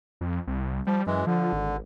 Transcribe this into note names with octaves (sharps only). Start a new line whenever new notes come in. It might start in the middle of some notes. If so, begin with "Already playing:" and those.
F2
C2
F3 G3
F#2 E3 G#3
D3 F3
G#1